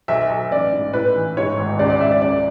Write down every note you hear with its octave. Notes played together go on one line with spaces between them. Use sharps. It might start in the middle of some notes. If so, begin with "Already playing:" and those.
B1 E5
B1
A1 D5
G#2
A2 B4
E3
G#2 C#5
G#1
C#2 D5
D5
C#2 E5
D5
F#2 D5